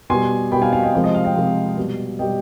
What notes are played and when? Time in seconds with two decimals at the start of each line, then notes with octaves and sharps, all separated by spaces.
0.10 B2 G3 G#5 C6
0.52 B2 G5 B5
0.55 G3
0.62 F5 G#5
0.72 F5 G#5
0.83 D#5 G5
0.94 C3 F3 G#3 F5
1.04 D#5
1.14 F5
1.25 D#5 G5
1.35 C3 F3 G#3
1.77 B2 G3
2.19 B2 G3 D#5 G5